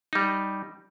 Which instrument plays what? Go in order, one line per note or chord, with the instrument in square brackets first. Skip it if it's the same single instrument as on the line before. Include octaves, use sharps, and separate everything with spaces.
[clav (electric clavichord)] G3 D#4